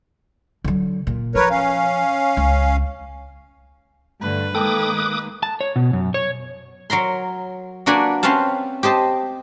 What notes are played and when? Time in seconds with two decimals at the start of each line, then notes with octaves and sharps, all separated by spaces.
0.64 D3 F#3
1.07 A#2
1.35 F3 A#4 B4 C#5
1.50 C#4 F5
2.37 C#2
4.21 G2 D3 A3 B4
4.55 D#3 G#3 A#3 A4 G5 D6 D#6
5.00 F#6
5.43 A5
5.61 C#5
5.76 B2
5.93 F#2
6.14 C#5
6.90 F#3 A#4 A#5 C6
7.86 A#3 D4 F#4 B4 D5 G#5
8.23 C4 C#4 B4 F5 A5
8.83 G4 C5 D#5 A5